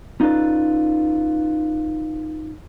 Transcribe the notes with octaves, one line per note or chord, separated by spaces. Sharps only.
C#4 D#4 F4 A4 B4 D5